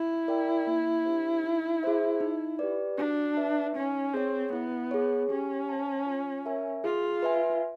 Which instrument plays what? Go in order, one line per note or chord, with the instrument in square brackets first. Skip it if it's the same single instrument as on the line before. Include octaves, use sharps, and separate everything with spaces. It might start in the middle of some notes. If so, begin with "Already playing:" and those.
Already playing: [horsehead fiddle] E4
[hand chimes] A#4 D5 G5
A#3
D4 G4 C5
D#4
G#4 C5 E5
D#4
G4 B4 D5
[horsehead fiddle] D4 [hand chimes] F#4
[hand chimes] B4 E5
[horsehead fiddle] C#4 [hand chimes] D#4
[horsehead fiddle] C4 [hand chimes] G#4 C#5
[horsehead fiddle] B3 [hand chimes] E4
[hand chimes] G#4 C#5
[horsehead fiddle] C#4 [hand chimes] G4
[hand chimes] C5 F5 A5
F4
A#4 C#5 E5 G#5
[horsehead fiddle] F4 [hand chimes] G#4
[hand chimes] B4 E5 G#5